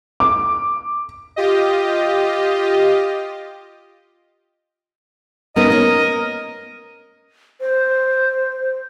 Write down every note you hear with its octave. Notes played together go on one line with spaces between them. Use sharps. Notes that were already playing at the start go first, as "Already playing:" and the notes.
D6
F4 G4 D#5
B3 C#4 D#4 A#4 D#5
A#3 C#4 C#5
C5